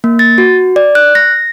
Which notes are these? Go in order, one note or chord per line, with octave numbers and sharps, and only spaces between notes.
A#3
A6
F#4
D5
F#6
A#6